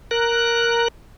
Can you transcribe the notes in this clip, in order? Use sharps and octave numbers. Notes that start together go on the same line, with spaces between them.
A#4 F#6